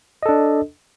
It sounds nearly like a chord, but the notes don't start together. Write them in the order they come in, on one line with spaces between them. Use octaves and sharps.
D#5 A4 D4